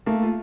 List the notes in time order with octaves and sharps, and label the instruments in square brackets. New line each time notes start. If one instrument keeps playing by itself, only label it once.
[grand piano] A3 [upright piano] A#3
[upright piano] F4